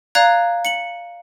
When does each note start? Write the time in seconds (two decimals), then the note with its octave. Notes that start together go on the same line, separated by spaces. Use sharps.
0.15 D5 F5 A#5 F#6 G#6
0.65 C#7 F#7